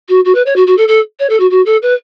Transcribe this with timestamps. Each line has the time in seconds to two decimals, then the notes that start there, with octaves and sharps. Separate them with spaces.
0.09 F#4
0.25 F#4
0.35 B4
0.46 C#5
0.56 F#4
0.67 F#4
0.77 A4
0.88 A4
1.20 C#5
1.30 A4
1.40 F#4
1.51 F#4
1.66 A4
1.82 B4